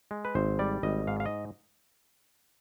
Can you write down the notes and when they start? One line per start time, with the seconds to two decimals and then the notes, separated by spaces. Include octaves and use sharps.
0.11 G#3
0.25 B4
0.35 G#1 C5
0.59 G3 D5
0.83 G#1 D#5
1.07 G#2 F5
1.20 F5
1.26 D#5